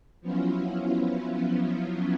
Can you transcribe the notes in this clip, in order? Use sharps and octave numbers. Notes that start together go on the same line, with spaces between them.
F3 F#3 B3 C#4 E4 F4